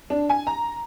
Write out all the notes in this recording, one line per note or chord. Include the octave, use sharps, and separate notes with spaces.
D4
G#5
A#5